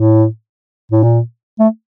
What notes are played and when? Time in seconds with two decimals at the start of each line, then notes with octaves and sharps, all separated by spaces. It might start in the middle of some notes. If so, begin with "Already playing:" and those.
Already playing: A2
0.92 A2
1.03 A#2
1.59 A3